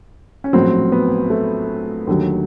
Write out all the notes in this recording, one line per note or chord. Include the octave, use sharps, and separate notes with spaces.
C#4
A#1 A2 F#3 C4
B3
A3
D#2 D3 F#3